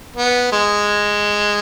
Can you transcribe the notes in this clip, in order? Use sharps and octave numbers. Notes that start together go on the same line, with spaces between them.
B3
G#3